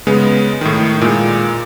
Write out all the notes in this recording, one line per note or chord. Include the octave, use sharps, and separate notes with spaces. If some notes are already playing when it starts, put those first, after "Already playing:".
C#3 G#3 B3
A2 D#3
A#2 G#3